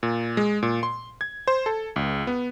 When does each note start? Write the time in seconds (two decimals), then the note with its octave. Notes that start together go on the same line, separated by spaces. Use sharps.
0.03 A#2
0.37 G#3
0.63 A#2
0.83 C6
1.21 G#6
1.48 C5
1.66 A4
1.96 C#2
2.27 B3